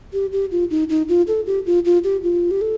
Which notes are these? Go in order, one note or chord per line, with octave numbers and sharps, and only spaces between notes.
G4
G4
F4
D#4
D#4
F4
A4
G4
F4
F4
G4
F4
G4
A4